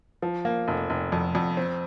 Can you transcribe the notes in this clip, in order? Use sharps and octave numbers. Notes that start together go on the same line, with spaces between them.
F3
A#3
F1
F1
F2
F2
C4